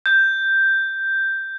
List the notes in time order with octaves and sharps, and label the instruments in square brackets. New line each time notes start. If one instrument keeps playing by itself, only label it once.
[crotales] G6